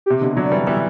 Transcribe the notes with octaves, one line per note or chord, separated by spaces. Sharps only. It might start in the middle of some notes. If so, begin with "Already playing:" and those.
C3 G4
B2 D3
D3 F#3 D5
E3 G3
E3 G3 E5